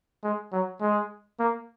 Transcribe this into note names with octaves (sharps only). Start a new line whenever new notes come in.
G#3
F#3
G#3
A#3